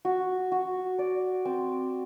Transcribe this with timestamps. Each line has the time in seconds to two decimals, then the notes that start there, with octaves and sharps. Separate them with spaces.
0.05 F#4
0.52 F#4
0.99 D5
1.45 C4